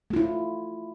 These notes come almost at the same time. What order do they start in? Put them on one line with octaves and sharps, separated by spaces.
A3 F4 E4